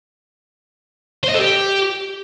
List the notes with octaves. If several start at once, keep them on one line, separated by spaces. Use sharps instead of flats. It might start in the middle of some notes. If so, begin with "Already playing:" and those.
C5
D#5
A4
G4